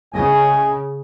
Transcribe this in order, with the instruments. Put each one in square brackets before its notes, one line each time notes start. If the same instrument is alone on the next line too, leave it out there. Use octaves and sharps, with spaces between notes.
[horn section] A2 D#5 G#5 [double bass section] C#3